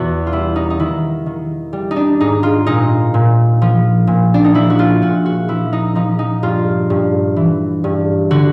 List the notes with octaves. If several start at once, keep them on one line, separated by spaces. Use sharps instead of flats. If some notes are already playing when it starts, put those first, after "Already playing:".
Already playing: E2 B2 F#4
F4
G3 E4
D#4
D#4
D#3 E4
D#3
G3
D#4
D4
G#2 D#4
F4
A#2 D#4
A#2
F3
A#2
D4
D#4
F3 E4
F#4
F4
A#2 F#4
F#4
F3 E4
D#4
F3 D#4
D#4
G2 F4
G2
E3
G2
D3 F#4